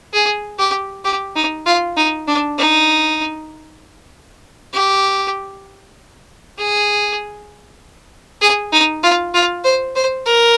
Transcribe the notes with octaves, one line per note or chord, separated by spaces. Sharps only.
G#4
G4
G4
D#4
F4
D#4
D4
D#4
G4
G#4
G#4
D#4
F4
F4
C5
C5
A#4